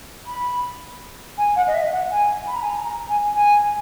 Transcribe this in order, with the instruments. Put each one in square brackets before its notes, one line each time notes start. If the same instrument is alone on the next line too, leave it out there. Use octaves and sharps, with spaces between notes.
[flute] B5
G#5
F#5
D#5
E5
F#5
G#5
B5
A#5
G#5
A#5
A#5
G#5
G#5